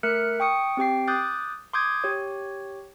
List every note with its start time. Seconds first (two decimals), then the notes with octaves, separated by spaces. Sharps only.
0.03 A3 A#4 E5 F6 F#6 C#7
0.40 G5 C#6 D#6 C#7
0.77 C4 G4 G5 C7
1.08 D6 D#6 F#6 G6 A6
1.73 C6 D6 D#6 G6 G#6
2.04 G4 C#5